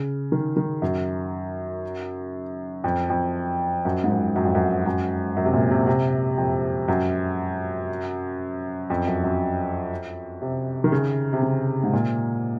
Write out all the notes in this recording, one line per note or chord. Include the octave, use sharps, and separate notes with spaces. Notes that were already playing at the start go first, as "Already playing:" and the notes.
Already playing: C#3
D#3
D#3
F#2
F2
F2
F#2
G#2
F#2
F#2
F2
F#2
F#2
F#2
C3
A#2
C3
C3
F2
F#2
F2
F#2
F#2
C3
D#3
C#3
C3
C#3
G#2
A#2